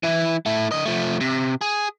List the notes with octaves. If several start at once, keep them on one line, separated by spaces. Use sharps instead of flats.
E3 E4
A3 E4
D3 D#5
F3 A3
C3
G#4